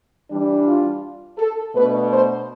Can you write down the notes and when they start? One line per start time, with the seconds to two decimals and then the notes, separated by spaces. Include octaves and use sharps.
0.30 E3 G3 D4
0.67 F4
1.39 A4
1.75 B2 A3 D4 B4
2.11 C5